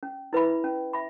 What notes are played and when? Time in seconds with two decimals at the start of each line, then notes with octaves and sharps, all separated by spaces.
0.03 C#4
0.33 E4 B4 E5 B5
0.64 C#4
0.93 E5 B5